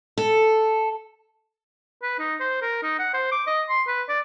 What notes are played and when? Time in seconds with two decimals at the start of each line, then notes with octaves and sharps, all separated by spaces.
0.17 A4
2.03 B4
2.19 D#4
2.40 C5
2.62 A#4
2.83 D#4
2.99 F#5
3.14 C5
3.32 D6
3.47 D#5
3.69 C6
3.87 B4
4.09 D5